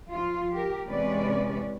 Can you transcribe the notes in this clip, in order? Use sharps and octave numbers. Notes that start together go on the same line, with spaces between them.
F3 F4
G4 A#4
E2 C3 G#3 C#4 B4 D5